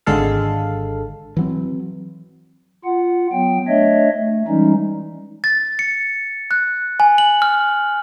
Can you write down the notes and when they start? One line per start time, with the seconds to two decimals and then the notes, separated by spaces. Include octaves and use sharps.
0.06 G#1 D3 G#3 A4 F5
1.37 E3 F#3 C4
2.84 F4 F#5
3.32 F#3 B3 G5
3.68 A3 D4 C#5 D#5 E5
4.17 A3
4.48 E3 G3 G#3 C#4 D#4
5.44 A6
5.79 C#7
6.51 F#6
7.00 G#5
7.18 F#7
7.42 F6